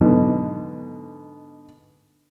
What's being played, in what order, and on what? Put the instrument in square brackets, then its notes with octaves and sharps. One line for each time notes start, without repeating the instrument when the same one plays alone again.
[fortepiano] G#2 B2 D3 [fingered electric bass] F#3 B3